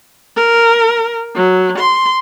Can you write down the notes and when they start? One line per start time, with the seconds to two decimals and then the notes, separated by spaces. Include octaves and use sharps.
0.36 A#4
1.35 F#3
1.78 C6